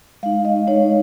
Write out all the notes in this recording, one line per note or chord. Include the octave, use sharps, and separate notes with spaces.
G#3 D#4 F5
D#5
G#3 D#4 C#5